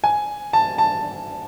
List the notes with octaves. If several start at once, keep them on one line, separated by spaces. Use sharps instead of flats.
G#5
A5
A5